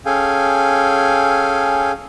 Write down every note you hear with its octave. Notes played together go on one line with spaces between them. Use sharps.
C#4 G#4 A4 F5 G5 G#5